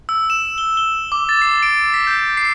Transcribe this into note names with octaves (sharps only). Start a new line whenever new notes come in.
E6
E7
G7
G7
D6
A6
C7
D7
B6
G6
C7